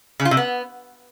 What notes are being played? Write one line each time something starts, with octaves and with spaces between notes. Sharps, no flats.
C#3
F4
C3
B3